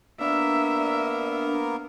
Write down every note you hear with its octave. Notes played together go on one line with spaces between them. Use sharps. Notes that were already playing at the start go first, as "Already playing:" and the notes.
A#3 B3 D4 A#4 E5